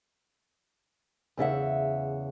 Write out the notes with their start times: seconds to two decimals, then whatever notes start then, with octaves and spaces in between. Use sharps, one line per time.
1.37 E2 C#3 E5 F#5